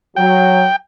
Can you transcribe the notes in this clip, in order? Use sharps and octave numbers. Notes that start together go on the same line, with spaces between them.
F#3 G5